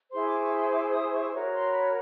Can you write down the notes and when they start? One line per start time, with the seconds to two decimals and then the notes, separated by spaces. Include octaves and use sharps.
0.11 E4 G#4 C5 C6
0.27 D6
0.41 C#6
0.57 C6
0.72 D6
0.92 D#6
1.13 C#6
1.33 F#4 A#4 C#5
1.53 C6
1.72 B5